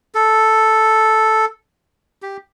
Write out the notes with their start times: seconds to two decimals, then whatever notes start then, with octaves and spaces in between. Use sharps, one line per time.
0.15 A4
2.22 G4